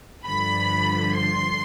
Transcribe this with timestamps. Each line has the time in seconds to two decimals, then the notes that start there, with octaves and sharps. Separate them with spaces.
0.25 G2 D3 F3 B5
1.15 C6